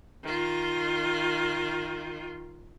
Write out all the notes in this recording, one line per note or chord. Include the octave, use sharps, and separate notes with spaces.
D#3 F4